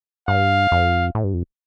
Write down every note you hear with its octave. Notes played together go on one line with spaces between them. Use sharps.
G2 F5
F2
A2
G2
F2